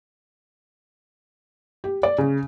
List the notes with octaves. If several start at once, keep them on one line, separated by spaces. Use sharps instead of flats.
G4
D5
C#3